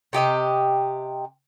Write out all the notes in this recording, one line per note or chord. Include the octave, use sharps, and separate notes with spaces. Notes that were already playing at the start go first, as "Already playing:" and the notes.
C3 G4 D#5 G5